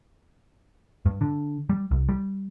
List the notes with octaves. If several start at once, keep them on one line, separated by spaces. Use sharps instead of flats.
G2
D3
G3
C2
G3